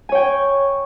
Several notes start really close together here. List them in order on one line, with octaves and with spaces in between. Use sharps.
G#5 C#5 G5